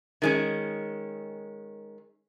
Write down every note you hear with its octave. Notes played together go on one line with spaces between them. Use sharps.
D#3 G#3 C#4